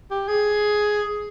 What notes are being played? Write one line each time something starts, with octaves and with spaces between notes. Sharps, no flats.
G4
G#4